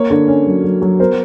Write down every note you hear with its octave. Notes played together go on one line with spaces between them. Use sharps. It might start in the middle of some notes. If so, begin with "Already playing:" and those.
Already playing: A#3 C#5
D3
C#4
F#3
F#3
F#3
B3 A#4 C5